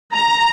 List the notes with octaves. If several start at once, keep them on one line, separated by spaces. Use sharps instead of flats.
A#5